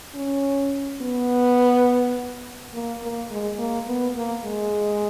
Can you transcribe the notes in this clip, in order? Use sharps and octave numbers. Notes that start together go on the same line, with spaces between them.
C#4
B3
A#3
A#3
G#3
A#3
B3
A#3
G#3